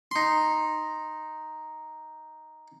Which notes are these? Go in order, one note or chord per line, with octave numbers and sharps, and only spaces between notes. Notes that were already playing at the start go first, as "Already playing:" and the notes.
D#4 C6